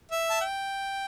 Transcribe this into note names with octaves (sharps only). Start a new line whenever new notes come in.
E5
A5
G5